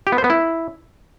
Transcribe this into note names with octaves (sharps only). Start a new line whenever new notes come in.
G4
B3
C5
B3
E4